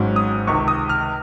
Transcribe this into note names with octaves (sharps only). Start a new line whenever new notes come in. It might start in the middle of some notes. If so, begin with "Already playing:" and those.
Already playing: G#1 G#2 F#3 C#4
D#6
C#2 C3 D#3 C#6
D#6
F6